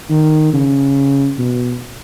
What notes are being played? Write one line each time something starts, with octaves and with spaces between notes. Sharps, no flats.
D#3
C#3
B2